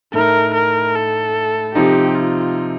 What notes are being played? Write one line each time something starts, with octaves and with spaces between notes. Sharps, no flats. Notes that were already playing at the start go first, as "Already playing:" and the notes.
A2 A3 D#4 A#4
A#4
A4
C3 F3 C4 D#4 G4
F4